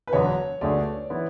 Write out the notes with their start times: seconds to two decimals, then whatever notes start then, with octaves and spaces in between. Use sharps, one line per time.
0.07 B4
0.12 E1 E2 D3 F#3 B3 C#5
0.61 D2 D3 A3 D4 G#4 D5
1.10 E3 B3 E4